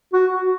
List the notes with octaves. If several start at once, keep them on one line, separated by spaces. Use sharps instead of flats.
F#4
F#4